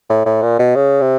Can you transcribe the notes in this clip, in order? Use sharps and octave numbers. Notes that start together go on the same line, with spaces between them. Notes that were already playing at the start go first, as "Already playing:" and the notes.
A2
A2
A#2
B2
C#3
C3